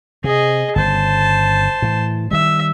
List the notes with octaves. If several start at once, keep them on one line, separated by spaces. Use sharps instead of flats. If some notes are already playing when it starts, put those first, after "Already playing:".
C3 G#4 D#5
G1 C#3 C5 A5
A2 E3
D#3 G3 E5